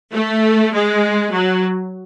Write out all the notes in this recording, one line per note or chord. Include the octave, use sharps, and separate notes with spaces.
A3
G#3
F#3